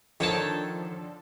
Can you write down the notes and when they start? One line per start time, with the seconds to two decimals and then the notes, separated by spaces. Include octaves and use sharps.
0.20 D3 D#3 F3 A4 C#5 G5 A5